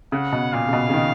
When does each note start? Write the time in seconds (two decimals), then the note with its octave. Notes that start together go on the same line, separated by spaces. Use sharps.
0.12 C#3 F#5
0.32 B2
0.53 A#2 F5
0.68 C#3
0.73 B2
0.89 C#3
0.93 D#3